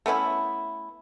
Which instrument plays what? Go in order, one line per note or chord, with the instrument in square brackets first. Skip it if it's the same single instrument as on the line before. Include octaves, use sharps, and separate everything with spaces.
[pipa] A3 B3 C#4 E4